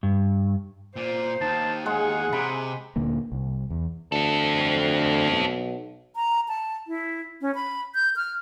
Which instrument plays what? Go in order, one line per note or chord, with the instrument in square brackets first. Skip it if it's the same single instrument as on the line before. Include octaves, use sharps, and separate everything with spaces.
[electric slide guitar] G2
[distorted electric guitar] A#2 [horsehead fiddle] C5
[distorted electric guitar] D#2 D#3 [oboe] A5
[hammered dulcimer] G#3 [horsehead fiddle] G#4 [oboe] F#5
[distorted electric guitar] C3 [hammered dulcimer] B5
[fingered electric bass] D2 A#2 D3 A#3
C2
E2
[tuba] D2 [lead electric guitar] C4 A4
[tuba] B1
[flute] A#5
A5
E4
C#4
B5
G6
F6